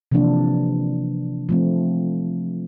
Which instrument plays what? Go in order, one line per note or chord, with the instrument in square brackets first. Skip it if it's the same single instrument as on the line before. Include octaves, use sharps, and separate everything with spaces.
[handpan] C3 E3 F3 A#3 D4
F3 A3 C4